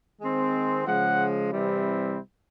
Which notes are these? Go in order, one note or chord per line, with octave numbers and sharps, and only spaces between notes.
D#3 G#3 C4
C#3 F3 G#3 F#5
C3 E3 G3 C4 E4